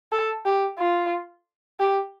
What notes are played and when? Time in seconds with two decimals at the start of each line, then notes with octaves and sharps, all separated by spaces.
0.12 A4
0.45 G4
0.79 F4
1.80 G4